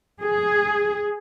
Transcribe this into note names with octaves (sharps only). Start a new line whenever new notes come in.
G#4